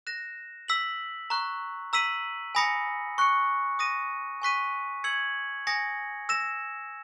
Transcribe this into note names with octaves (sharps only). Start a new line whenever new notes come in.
F#6 A#6 E7
E6 B6 F#7
A#5 C#6 F#6
A#5 E6 B6 D#7 F#7
G#5 B5 D#6 A#6 C#7
C#6 F#6 C#7
D#6 A#6 D#7
G#5 C#6 F#6 B6 D#7
E6 G#6 C#7 F#7
G#5 D#6 A#6 C#7
E6 A#6 E7